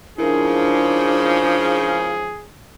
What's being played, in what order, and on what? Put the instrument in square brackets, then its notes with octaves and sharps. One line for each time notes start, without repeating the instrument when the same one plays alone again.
[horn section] G#2 C#3 F3 [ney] D4 [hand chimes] E4 A#4 [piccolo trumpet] G#4